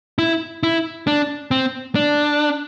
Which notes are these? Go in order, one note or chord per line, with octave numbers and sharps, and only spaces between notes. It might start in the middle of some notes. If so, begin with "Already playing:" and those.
E4
E4
D4
C4
D4